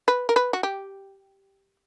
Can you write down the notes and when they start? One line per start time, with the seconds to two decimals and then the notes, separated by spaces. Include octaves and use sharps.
0.08 B4
0.29 A#4
0.36 B4
0.53 F#4
0.63 G4